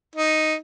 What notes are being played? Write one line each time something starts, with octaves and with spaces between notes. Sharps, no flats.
D#4